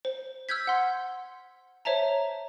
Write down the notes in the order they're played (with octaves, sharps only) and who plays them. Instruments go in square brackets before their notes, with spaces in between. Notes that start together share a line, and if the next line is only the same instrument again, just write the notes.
[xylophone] C5
E6 F6 G6 G#6 B6
F#5 C6
C5 C#5 E5 A5 A#5